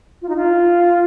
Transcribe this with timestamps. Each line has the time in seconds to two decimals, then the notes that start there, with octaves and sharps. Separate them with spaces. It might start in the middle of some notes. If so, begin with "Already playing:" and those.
0.22 F4
0.29 D#4
0.37 F4